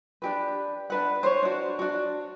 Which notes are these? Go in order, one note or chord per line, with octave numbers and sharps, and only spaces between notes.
D4 G4 B4
D4 B4 F#5
C5 C#5
D4 F#4
D4 F#4